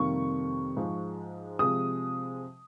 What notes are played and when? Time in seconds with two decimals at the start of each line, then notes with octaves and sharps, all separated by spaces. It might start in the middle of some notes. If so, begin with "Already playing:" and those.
Already playing: F2 C3 D#3 G3 A#3 C#6
0.76 G#2 F3 G#3
1.59 C3 F3 G#3 D#6